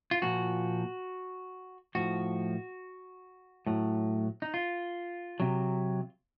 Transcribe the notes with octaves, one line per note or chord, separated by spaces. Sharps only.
F4
A#2 F3 F#4
A2 F3 F#4
A2 F#3
D#4
F4
C3 F#3